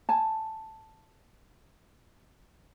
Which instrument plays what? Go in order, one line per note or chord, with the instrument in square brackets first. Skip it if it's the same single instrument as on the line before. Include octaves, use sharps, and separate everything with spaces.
[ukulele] G#5 A5